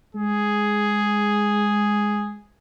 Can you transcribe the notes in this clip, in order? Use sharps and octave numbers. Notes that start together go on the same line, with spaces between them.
G#3 G#4